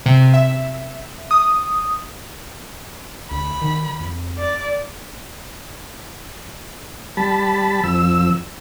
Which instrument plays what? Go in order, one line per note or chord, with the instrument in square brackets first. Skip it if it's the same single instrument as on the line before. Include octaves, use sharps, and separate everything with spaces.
[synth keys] C3
E5
D#6
[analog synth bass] D2 [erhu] B5
[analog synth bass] D#3
F2
[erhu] D5
[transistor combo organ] G3 A5 B5
F2 E6